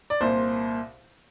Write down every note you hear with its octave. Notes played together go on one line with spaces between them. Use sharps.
D5
C2 A#2 C5